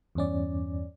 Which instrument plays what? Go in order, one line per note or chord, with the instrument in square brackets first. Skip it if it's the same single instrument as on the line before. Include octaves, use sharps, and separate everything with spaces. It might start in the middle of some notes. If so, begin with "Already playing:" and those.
[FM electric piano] E2 G2 C#4 D5